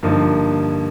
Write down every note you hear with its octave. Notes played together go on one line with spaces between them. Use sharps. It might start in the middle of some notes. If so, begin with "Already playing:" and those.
G2 D3 F3 A#3 D#4